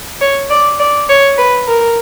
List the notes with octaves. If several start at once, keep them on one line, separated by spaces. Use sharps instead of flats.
C#5
D5
D5
C#5
B4
A#4